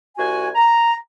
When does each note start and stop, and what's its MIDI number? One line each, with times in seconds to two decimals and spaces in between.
0.17 0.50 36
0.17 0.50 66
0.17 0.50 80
0.55 0.95 82